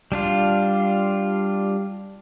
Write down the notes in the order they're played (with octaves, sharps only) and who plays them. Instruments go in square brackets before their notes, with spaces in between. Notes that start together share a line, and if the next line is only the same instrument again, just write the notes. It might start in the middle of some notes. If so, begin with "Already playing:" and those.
[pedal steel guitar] G3 D4 F4